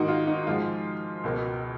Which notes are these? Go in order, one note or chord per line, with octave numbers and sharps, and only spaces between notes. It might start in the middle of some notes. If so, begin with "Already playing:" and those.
Already playing: G#2 D#3 A#3 D#4 F#4
F4
D#4
G#2 F3 G#3 F4
C#2 B2 A#3